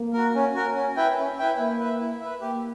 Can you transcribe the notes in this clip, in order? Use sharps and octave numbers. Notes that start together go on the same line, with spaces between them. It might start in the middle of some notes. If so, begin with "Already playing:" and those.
Already playing: A#3
F#4 A#4
C#4
F#4 A#4
C#4
E4 B4 E5 G5
C#4
E4 B4 E5 G5
A#3 E4
B4 E5
E4
B4 E5
A#3 G4